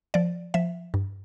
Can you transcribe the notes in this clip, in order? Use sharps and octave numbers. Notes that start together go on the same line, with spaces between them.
F3 D5
F3 E5
G2